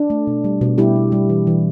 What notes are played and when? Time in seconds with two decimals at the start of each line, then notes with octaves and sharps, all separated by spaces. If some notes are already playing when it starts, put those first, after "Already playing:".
Already playing: D4
0.10 A3
0.27 B2
0.44 G3
0.61 B2
0.78 G3 E4 G4
0.96 B2
1.12 G3
1.30 E3
1.47 E3